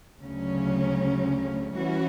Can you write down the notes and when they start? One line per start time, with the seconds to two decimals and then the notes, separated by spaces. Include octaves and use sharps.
0.21 D2 C#3 F#3 C#4
1.75 E3 G3 C#4 F#4